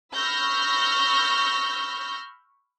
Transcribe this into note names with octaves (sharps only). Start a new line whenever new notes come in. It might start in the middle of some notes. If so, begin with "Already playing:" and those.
B5 C#6 E6 F6 G6 A#6